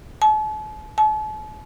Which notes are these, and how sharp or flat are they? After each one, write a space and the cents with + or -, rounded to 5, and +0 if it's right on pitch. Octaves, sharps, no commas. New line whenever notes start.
A5 -40
A5 -40